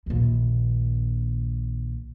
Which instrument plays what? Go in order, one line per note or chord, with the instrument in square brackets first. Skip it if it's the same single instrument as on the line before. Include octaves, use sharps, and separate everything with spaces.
[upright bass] A#1 D#2